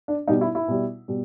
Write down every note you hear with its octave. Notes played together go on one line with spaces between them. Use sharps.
D4
B2 G3 D#4
E4
E4
B2 G3
B2 G3